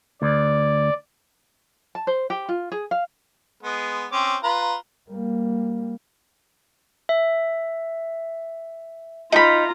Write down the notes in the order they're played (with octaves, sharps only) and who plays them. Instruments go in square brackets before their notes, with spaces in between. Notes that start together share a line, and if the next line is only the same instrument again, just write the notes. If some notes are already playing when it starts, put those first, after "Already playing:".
[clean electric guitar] D2 [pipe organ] D5
[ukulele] A5
C5
G4
F4
G#4
F5
[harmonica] G#3 B3
C4 C#4 D6
F4 B4 A#5
[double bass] G3 A#3
[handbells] E5
[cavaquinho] D#4 B5 [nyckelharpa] F4 A#5